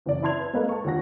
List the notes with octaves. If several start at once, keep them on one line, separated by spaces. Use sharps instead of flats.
F#1 E3 D5
E4 A5 C6 G#6 F7
B4
G#3 A#3 A4 B4 F5
A5 C#6
D#2 D4 F4 F#5 A#6